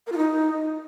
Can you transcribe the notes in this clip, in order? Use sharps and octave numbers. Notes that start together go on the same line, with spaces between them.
A#4
F4
D#4